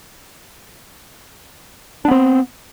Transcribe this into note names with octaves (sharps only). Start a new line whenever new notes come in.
B3 C4 D4